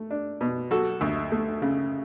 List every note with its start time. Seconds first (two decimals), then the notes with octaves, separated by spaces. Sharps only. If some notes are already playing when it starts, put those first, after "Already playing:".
Already playing: A3
0.11 D4
0.41 B2
0.71 F#3 F#4 A4
1.01 D2
1.32 A3
1.62 C#3